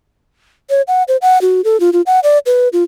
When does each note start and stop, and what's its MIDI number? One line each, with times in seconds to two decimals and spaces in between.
0.70 0.82 73
0.88 1.03 78
1.08 1.17 72
1.22 1.41 78
1.41 1.61 66
1.64 1.80 69
1.80 1.90 65
1.93 2.02 65
2.06 2.20 78
2.23 2.38 74
2.46 2.68 71
2.73 2.84 65